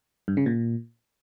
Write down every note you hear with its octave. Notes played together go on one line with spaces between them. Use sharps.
G2
C#3
A#2